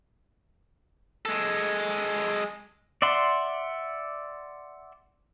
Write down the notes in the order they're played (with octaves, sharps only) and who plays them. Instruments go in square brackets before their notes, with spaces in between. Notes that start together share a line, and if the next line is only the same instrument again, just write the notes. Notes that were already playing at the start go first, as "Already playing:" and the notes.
[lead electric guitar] G#3 A4
[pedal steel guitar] D5 E5 F#5 C6